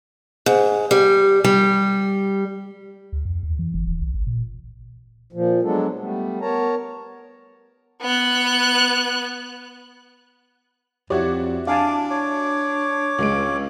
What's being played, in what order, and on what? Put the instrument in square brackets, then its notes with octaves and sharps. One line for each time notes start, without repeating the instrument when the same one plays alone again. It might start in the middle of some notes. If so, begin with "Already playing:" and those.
[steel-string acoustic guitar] G#2
G3
G3
[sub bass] D2
F2
D#2
E3
F#1
D#1
B1
G#1
A#2
[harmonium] A#2 F3
F#3 G#3 B3 D4 A4
G3 A3 B3
B3 A#4 C#5 A5 A#5
[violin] B3 F#6
[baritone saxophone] F2 [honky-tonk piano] E4 F#4 D5 [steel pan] G4 C#5
[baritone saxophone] D4 [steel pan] F5 G#5 A5 [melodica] D6
[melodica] C#5 D6
[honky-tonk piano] C#2 G#3 D7